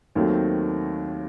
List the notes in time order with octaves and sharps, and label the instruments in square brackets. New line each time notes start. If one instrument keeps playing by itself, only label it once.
[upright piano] D#2 D#3 F#3 A3 C4